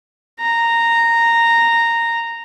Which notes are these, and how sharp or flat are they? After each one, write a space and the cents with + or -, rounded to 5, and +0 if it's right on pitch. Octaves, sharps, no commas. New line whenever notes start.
A#5 -10